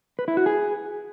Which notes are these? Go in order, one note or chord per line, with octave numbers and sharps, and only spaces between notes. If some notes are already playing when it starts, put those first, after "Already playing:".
B4
E4
F#4
G#4